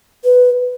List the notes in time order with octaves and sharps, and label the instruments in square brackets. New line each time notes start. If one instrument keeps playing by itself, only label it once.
[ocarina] B4